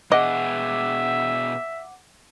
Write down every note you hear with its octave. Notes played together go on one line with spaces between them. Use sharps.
B2 G#4 D#5 E5 F#5 D6